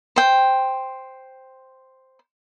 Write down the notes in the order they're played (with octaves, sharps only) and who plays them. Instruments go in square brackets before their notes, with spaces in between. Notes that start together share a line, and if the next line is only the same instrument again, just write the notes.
[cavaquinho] C5 G5